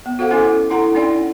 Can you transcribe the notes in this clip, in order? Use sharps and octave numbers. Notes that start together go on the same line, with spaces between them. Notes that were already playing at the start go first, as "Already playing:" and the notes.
B3
F#4 A4 C5 F5 F#5
C#4 E4 A4 G#5 D6
D4 E4 A4 F#5 A#5
C#4 D#4 E4 D5 F#5 G5